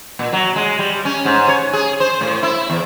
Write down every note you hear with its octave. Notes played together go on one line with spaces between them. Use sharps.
A#2
F#3
G#3
G3
C#4
G#2
C#5
G#4
C5
A2
E4
E2